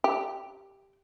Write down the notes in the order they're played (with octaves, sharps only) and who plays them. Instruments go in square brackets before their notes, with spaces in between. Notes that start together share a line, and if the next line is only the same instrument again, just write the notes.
[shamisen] G4